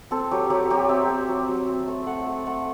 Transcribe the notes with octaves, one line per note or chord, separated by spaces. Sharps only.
C4 A4
F#3 G4
F#3 G4
F#3 G4
C4 E5
C4
F#3
F#3
C4
A3
A3 F#5
A3
A3 F#5